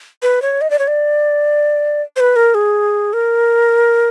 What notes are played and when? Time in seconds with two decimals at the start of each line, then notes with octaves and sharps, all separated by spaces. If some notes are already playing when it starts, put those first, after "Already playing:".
0.22 B4
0.42 C#5
0.61 D#5
0.70 D5
0.79 C#5
0.87 D5
2.16 C5
2.20 B4
2.36 A#4
2.54 G#4
3.13 A#4